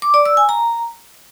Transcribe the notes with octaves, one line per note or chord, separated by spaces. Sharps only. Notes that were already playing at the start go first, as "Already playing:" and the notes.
D6
D5
E6
G#5
A#5